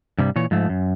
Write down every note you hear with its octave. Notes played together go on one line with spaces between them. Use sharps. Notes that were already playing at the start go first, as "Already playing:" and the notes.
G2 C3 G3
A#2 E3 C#5
G#2 F3 A3
F#2